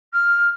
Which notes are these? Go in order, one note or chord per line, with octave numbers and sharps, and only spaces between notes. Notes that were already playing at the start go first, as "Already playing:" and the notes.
F6